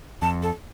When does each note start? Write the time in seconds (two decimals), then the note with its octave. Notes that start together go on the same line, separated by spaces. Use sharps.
0.22 F2 A5
0.42 A4